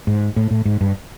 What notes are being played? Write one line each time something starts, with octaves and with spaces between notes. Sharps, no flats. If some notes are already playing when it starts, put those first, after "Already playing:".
G#2
A2
A2
G#2
G2